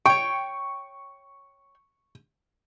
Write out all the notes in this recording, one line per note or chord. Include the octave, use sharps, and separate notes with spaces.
C#5 G5 C#6